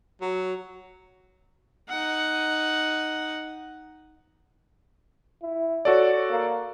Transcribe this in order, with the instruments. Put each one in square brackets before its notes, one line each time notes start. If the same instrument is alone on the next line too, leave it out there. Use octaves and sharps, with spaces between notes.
[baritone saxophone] F#3
[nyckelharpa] D#4 F#5
[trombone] E4
[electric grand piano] F#4 A4 D5 [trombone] C#5
[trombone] A#3